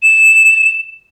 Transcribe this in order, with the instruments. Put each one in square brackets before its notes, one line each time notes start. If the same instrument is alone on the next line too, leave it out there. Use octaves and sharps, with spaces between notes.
[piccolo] E7